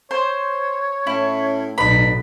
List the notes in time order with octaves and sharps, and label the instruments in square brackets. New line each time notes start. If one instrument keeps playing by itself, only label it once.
[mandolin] C5 [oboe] C#5
[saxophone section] A2 C#4 [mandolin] E4
[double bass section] B1 A2 [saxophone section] D4 D#4 B4 [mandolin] B5